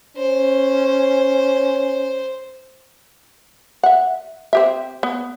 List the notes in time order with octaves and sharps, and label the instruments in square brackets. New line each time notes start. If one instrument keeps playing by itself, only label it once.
[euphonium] C#4 [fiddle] C5
[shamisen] E5 F#5
C4 G4 E5
B3